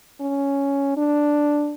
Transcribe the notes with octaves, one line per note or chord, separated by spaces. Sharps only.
C#4
D4